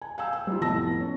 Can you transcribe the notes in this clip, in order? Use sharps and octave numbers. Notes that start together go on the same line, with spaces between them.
G#5
F5 G5 G#5 E6
E6
G3 D#4 F4
F1 A2 B3 A5 E6 A#6
C#4